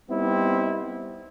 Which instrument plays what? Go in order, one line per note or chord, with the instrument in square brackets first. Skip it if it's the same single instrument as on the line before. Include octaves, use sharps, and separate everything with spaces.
[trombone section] G3 B3 C4 D#4 E4